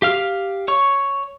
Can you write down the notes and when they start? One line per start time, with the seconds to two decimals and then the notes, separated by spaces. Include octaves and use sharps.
0.02 G4 F5 F6
0.68 C#5 C#6